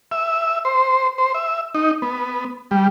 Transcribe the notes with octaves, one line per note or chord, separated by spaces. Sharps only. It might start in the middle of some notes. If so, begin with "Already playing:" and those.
E5
C5
C5
E5
D#4
B3
G3